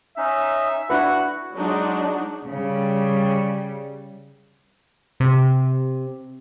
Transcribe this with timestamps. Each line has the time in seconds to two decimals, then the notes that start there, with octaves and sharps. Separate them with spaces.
0.18 C#4 D#4 E5
0.90 D4 E4 F#4 B4 F#5 C#6
1.57 F#3 G#3 D4 D#4 F#4
2.47 C#3 G3
5.20 C3